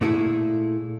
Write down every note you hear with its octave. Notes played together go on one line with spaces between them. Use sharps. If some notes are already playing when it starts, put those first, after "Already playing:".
A#2 A3 E4 G#4 A4